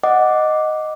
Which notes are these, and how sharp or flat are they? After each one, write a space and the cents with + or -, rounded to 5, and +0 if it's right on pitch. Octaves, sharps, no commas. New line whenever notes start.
D#5 +0 F#5 +0 D6 +0